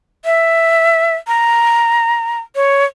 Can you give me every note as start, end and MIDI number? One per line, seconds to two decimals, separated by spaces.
0.25 1.15 76
1.27 2.39 82
2.56 2.85 73